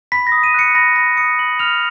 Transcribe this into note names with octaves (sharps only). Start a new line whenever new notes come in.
B5 B6
A#6
D#6
D#7
F#6 C#7
B5 A#6
B5 A#6
D#6 C#7
B5 F#7
F6 F7